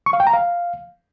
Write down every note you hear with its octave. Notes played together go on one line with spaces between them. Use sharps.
C#6
F5
G5
A#5
F5